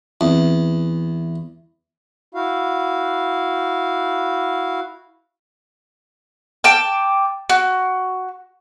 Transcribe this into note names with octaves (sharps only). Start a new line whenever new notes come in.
E2 C4
E4 F#4 F5
G5 A5 D6
F#4